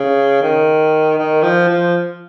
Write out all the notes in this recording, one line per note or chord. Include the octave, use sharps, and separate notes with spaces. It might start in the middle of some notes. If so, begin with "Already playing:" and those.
Already playing: C#3
D#3
D#3
F3
F3